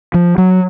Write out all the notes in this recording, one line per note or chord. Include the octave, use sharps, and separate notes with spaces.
F3
F#3